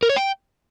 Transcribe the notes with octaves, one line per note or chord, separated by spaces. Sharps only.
A#4
C#5
G5